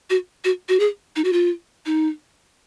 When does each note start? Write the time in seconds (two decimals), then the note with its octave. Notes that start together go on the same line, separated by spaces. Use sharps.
0.10 F#4
0.45 F#4
0.69 F#4
0.80 G#4
1.16 D#4
1.24 F#4
1.33 F4
1.86 D#4